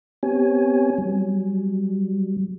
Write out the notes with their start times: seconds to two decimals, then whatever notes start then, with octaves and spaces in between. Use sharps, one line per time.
0.23 B3 C4 G4 C#5 G#5
0.98 F#3 G3